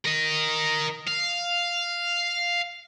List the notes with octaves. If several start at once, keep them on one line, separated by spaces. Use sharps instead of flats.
A#4 D#5
F5